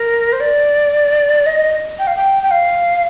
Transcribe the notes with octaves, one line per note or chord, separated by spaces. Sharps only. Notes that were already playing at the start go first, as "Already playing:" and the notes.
Already playing: A#4
C5
D5
D#5
G5
F5
G5
G5
F5